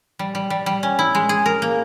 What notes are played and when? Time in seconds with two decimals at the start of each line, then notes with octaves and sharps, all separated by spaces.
0.19 G3
0.35 G3
0.50 G3
0.66 G3
0.83 C#4
0.99 E4
1.15 G#3
1.29 G#4
1.46 A#4
1.62 A#3